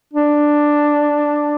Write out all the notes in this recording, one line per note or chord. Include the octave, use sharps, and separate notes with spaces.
D4